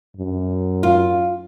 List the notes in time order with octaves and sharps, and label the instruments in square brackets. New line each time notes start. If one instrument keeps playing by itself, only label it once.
[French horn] F#2
[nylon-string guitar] F4